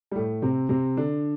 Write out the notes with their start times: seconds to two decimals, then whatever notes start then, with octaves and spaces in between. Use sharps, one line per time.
0.12 G3
0.15 A2 A3
0.42 C3 C4
0.69 C3 C4
0.97 D3 D4